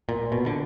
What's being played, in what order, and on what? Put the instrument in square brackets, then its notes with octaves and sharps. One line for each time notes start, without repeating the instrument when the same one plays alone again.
[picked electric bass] A#2
B2
D3